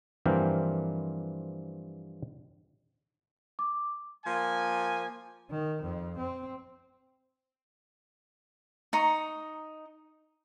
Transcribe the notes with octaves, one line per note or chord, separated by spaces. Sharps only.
G2 E3 F3 A#3 C4 G5
D6
F3 A#3 G#5
D#3
F2
C4
D#4 A#5 C#6